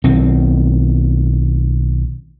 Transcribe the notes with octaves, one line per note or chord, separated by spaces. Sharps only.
B1 D#3 C4